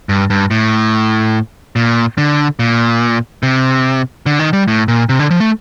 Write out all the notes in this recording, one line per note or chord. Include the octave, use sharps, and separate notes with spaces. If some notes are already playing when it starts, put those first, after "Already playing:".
G2
G2
A2
A#2
D3
A#2
C3
D3
D#3
G3
A2
A#2
C3
D3
F3
A3